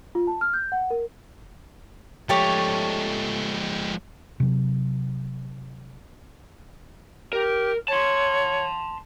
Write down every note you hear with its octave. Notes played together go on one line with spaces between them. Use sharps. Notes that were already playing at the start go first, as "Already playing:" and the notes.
F4
A5
F6
G6
F#5
A#4
F3 G#3 A3 G4 C#5
C3 F#3
G4 A#4
C#5 A5 C6